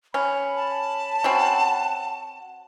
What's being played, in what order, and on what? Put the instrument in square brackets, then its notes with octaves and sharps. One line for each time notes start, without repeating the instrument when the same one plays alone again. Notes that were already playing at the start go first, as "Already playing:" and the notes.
[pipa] C#4 [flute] B5
[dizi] A5
[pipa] C4 C#4 F#4